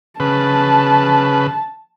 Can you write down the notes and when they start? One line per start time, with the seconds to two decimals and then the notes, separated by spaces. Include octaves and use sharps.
0.20 C#3 B4 A5